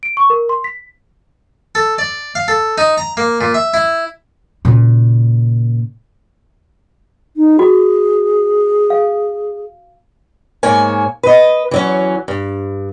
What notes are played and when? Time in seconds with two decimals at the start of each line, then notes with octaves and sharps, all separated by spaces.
0.03 D7
0.17 C#6
0.30 A#4
0.49 C6
0.64 B6
1.75 A4
1.98 D5
2.35 F5
2.48 A4
2.78 D#4
2.98 A#5
3.17 A#3
3.41 A#2
3.54 E5
3.74 E4
4.65 A#2 C#3
7.36 D#4
7.59 F#4 G#4
8.90 F5
10.63 G#2 A#3 C#5 G#5
11.23 B4 D#5
11.71 E3 F#3 C#4
12.28 G2